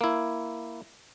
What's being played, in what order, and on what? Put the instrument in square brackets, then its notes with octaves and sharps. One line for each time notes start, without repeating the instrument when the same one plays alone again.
[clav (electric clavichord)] A#3 E4